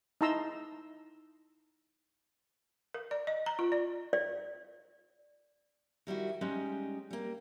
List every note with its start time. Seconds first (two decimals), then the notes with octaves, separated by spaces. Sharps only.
0.21 D#4 E4 A5 A#5 C6 E6
2.94 A#4
3.11 D5
3.27 D#5
3.46 A#5
3.59 F4
3.72 D5
4.13 D5
6.07 D#3 G3 E4 F#4
6.41 G3 G#3 C#4 D#4
7.11 G3 A#3